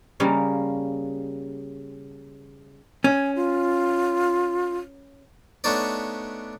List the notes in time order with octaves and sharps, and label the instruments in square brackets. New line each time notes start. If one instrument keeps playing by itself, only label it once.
[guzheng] C#3 G3 A#3 C#4
[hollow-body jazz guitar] C#4 [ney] G#5
[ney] F4
[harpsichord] A3 B3 D4 D#4 C#5 D5